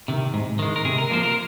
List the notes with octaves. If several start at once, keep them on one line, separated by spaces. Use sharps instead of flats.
C3 D#3
G#2
D#3 G#3
A#4
C3 G#4
A#4
F3 A#3 C5
A#4